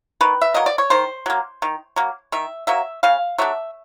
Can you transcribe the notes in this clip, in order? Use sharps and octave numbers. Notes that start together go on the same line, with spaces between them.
D#3 B4
E5
F#3 A#3 D#5
D5
C#5
D#3 C5
F#3 A#3
D#3
F#3 A#3
D#3 E5
F#3 A#3 E5
C#3 F5
F#3 A3 D4 E5